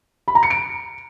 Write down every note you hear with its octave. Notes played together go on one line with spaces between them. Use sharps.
B5
A#5
C#7
D7